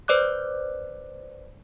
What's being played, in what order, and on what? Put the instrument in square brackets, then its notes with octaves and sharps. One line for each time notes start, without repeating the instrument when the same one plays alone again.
[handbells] B4 C5 D5 D6 F#6